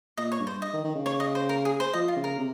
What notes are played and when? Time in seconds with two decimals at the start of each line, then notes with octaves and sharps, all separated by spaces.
0.17 A#2 D#5
0.32 C#5
0.40 G2
0.47 C5
0.62 D#5
0.73 D#3
0.84 D#3
0.95 C#3
1.06 C#5
1.20 D#5
1.35 C5
1.49 A#4
1.65 G#4
1.80 C5
1.93 F3 D#5
2.08 F4
2.16 C#3
2.24 A#4
2.38 C3